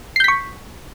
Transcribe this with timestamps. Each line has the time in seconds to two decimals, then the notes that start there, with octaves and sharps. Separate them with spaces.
0.16 C7
0.20 G6
0.24 B6
0.28 C#6